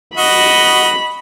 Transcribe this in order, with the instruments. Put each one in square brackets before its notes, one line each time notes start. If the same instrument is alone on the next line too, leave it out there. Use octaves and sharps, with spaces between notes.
[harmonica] F#4 D#5 [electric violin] B5